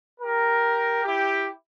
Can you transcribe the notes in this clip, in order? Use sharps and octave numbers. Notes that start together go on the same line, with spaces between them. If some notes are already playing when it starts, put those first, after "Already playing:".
G4 A#4
E4 G4